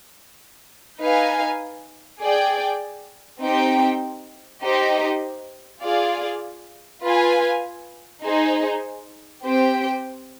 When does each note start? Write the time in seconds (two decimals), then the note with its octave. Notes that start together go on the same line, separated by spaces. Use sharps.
0.99 D#4 B4 F5 G#5
2.19 G#4 D5 G5
3.41 C4 D#4 G4 C5 G5
4.62 D#4 G4 C5 D#5
5.82 F4 G#4 D5 F5
7.02 F4 B4 F5 G#5
8.23 D#4 G#4 C5
9.43 C4 G4 C5 G5